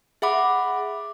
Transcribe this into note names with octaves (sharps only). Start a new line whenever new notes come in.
G#4 E5 F#5 B5 D6